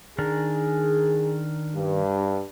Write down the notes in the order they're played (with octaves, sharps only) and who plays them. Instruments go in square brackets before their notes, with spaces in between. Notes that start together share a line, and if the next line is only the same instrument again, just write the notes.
[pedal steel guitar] D#3 D4 A#4 [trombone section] G#4
[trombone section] G2